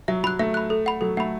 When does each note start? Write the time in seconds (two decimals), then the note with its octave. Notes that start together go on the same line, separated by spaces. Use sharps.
0.08 F#3 E5
0.24 F#3 B5 F#6
0.39 A3 E5
0.54 B5 F#6
0.70 A4
0.86 F#5 B5
1.01 F#3 A4
1.17 A3 F#5 B5